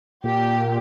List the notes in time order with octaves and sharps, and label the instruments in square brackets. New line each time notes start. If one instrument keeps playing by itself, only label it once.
[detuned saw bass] A#2 [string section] G4